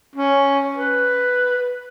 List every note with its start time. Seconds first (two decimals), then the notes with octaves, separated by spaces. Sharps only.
0.16 C#4
0.77 B4